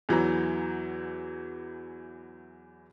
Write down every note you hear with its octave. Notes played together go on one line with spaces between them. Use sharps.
E2 E3 F#3 A#5